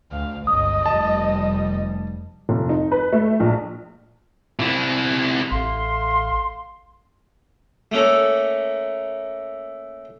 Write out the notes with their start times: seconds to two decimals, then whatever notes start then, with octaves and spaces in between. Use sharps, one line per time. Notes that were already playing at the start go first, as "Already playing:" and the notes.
0.12 D2 F5
0.47 G1 C#2 D#5 D#6
0.86 F1 G3 A5
2.49 F1
2.69 D#4
2.92 B4
3.12 A3
3.40 A#1
4.59 C3 E4
5.51 A1 A3 F5 C6
7.92 A3 A#3 C#4 A4